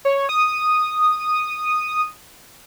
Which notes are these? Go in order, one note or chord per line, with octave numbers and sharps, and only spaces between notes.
C#5
D#6